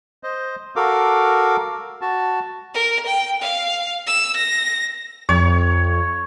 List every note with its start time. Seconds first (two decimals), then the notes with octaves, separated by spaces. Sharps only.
0.23 C5 D#5
0.76 F#4 A4 A#4 F5 D6
2.01 F#4 A5
2.74 A#4
3.06 G5
3.41 F5
4.07 E6
4.36 A#6
5.29 F2 C#5